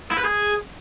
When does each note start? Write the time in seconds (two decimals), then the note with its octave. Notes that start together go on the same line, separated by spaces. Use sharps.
0.11 E4
0.18 B4
0.25 G#4